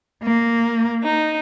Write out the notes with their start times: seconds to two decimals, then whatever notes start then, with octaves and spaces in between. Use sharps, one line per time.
0.22 A#3
1.03 D#4